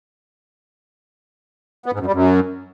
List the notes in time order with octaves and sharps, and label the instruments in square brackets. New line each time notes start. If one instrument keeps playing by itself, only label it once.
[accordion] B3
G#2
F#2
G3
F#2